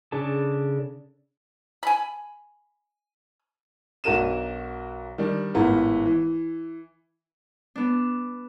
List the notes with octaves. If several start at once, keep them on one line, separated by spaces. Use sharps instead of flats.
C#3 D4 G#4 A4 A5
G#5 B5
B1 D4 F#4 A#4 D#7 E7
D#3 G3 D4
G#1 A2 B3 F4
E3
B3 D4